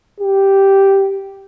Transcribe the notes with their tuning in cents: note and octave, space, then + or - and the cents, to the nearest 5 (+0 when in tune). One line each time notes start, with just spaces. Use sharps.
G4 -5